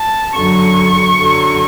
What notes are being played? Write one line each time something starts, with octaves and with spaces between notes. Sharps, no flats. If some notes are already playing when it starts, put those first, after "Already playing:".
Already playing: A5
F#2 D3 F#3 C#6
F#2 D3 F#3